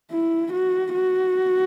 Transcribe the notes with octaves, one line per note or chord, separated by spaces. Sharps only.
E4
F#4
F#4